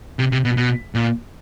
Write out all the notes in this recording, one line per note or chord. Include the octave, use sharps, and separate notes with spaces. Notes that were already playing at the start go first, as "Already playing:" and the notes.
C3
C3
B2
B2
A#2